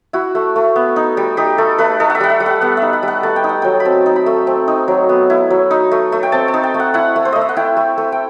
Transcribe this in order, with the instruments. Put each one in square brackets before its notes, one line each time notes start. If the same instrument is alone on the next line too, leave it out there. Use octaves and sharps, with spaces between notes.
[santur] E4 F#4
A3
A3
B3
D#4
G3
D#4 G4
A3 A4
A3 B4
D#4 A4
F#5
E5
G3 F#5
E5
G3
F#5
B3 F#5
D#4 E5
F#5
G3
F#5
A3 A5
G5
D#4
F#5
F#3 G5
B5
C4 A5
D#4
B5
A3
C4
D#4
F#3
B3
E4
F#3
D#4
A3
A3
G5
C4 A5
A5
D#4
G5
A3
F#5
E4 F#5
A3
C5
A3 D#5
E5
F#5
E4 G5
A3
A3
G5